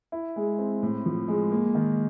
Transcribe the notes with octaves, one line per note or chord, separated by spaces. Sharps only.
E4
G#3
C4
A2
F3
G#3
A#3
D#3